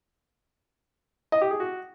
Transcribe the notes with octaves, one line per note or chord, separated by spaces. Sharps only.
D#5
G4
G#4
F#4